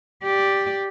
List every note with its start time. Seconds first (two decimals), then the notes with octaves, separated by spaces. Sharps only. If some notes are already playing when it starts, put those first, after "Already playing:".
0.23 G4 D5